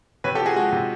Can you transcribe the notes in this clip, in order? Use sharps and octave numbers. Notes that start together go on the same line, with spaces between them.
C3 B4 C#5
G4 A4
F3
F#4 G#4
G#3 F#4 G#4
C3